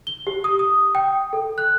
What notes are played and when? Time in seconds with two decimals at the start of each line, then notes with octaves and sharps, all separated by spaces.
0.07 G7
0.27 G4
0.44 D#6
0.59 D#6
0.95 G5
1.33 A4
1.58 F#6